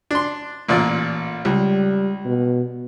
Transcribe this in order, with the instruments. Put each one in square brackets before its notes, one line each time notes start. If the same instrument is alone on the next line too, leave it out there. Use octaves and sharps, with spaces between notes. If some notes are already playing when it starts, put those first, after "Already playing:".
[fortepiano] D4 C6
A1 A#2 D5
[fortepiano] C#2 [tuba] G3
[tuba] B2